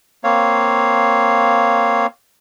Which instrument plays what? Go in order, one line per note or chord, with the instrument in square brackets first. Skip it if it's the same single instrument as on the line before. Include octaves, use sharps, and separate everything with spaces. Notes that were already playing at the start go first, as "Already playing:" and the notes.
[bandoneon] A#3 C4 C#5 F5